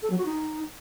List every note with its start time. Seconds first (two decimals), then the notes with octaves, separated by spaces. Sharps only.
0.03 A4
0.10 F#3
0.18 F#4
0.26 D#4